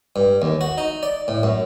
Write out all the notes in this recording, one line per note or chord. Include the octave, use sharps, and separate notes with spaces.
G2
D#2
F#4
D#4
D5
A2
F#2